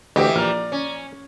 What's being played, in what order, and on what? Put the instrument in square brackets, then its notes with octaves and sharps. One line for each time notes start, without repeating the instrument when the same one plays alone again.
[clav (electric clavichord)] D2 [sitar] E3 G4 [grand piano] D#5 E5 G5
[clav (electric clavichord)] A#1 [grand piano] D5 A#5 F6
[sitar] C#4